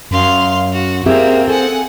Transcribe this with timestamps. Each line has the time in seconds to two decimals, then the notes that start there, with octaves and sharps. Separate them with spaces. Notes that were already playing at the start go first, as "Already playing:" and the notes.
0.11 F#2 F5 C6
0.73 F#4
1.06 A#3 C4 G4 G#4 E5
1.48 G#4 A4 F#5 G#5